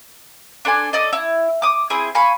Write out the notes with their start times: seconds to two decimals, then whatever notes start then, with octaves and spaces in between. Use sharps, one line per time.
0.65 D4 A4 C5 G#5
0.93 A4 D5 D#5
1.13 E4
1.62 D6 D#6
1.90 C4 E4 G#4
2.15 F5 G#5 B5 C#6